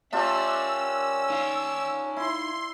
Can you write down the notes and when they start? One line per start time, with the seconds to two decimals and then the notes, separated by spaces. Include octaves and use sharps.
0.13 C#4 D4 F4 G4 A#4 E5 E6
1.30 D#4 F5
2.17 E4 C6